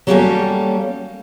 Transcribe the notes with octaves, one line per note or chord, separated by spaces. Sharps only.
F#3 G3 A#3 C#4 G4 A4